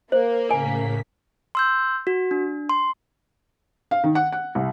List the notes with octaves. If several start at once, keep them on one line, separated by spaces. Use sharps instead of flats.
A#3 C5
A2 C#3 A#4 G#5 B6
C6 E6 G6
F#4
D4
C6
F5
D#3
F#5
F#5
C2